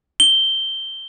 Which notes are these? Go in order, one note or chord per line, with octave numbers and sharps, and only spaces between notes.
G7